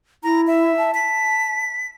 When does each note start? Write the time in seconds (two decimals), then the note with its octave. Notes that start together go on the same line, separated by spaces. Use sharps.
0.23 E4 A#5
0.47 E5
0.77 A5
0.94 B6